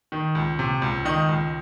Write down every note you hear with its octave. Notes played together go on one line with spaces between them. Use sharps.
D#3
C#2
C3
C#2
D#3 D#5
C#2